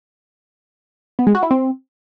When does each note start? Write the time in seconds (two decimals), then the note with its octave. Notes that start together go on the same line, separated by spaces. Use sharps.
1.19 B3
1.27 G#3
1.35 F#4
1.43 E4
1.51 C4